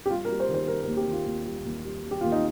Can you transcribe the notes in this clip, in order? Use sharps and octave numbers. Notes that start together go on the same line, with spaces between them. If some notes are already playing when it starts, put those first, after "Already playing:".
G4
G3 F4
A#4
G3
C5
D#3
C5
G3 A#4
A#4
D#2
G4
D#3
F4
D#2
G3
D#2
G3
G3
G4
D#2 F4
D#4